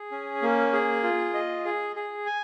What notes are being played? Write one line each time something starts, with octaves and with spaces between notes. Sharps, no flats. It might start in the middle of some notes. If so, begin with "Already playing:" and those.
Already playing: G#4
C#4
A#3
G#4
F4
D#5
G#4
G#4
G#5